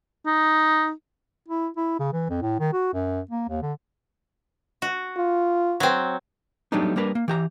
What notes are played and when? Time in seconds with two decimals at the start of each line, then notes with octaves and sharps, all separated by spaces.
0.26 D#4
1.48 E4
1.77 E4
1.99 C#3
2.13 E3
2.29 F2
2.42 A2
2.59 D#3
2.73 F#4
2.93 F#2
3.31 A#3
3.48 D#2
3.62 D3
4.82 F#4
5.17 F4
5.80 F#3 C4
6.72 F#3 G3 A3 B3 D4 D#4
6.96 G3 A#3 D4 A#4 B4
7.15 A#3
7.28 E3 G4 A#5